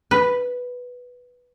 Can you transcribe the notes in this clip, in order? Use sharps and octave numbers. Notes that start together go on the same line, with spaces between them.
B4